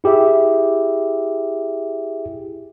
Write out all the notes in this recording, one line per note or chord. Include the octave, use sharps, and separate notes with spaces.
E4 G4 G#4 E5